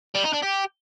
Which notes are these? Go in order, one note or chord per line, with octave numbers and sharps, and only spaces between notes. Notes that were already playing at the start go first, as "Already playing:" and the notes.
G3
D#4
D4
G4